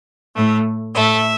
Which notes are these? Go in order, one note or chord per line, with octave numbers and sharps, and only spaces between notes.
A2 A3
A2 A3 E5